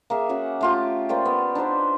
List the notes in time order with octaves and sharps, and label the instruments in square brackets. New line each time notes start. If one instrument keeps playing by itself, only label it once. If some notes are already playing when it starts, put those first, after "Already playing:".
[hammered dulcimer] A#3 G#4 E5
C#4 F#4 F#5
A3 F4 G4
A#3 C5 D5 G5
B3
D4 D#4 B4 C5